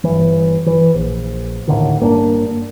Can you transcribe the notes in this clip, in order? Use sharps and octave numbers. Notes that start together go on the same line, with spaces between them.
G1 E3
E3
A#1
D#2 A2 D3 D#3
G1 A#3 C#4 D4